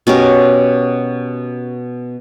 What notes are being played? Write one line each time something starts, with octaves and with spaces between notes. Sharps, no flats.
B2 C#4 G4 A#4